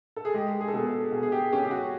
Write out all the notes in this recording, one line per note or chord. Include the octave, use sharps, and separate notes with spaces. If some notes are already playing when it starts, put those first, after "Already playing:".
A4
G#4
G#3 G4
G#4
A4
B2 G#4
A4
B2 G#4
G#4
G4
C#4 G4
G4
F#4